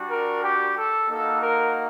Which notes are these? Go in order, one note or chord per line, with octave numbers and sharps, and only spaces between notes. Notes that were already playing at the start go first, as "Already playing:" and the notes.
Already playing: G3 D4 F#4
A#4
G4
A4
A#3 D#4 F#4 A4
A#4